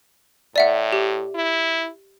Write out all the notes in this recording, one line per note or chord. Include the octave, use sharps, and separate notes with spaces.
A2 D5 E5 F#5
G4
E4